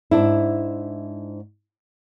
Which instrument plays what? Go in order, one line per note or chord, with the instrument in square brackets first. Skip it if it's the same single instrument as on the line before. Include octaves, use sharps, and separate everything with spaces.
[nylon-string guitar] G#2 D4 E4